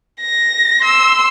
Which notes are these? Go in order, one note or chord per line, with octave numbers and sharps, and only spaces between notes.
A#6
C6 E6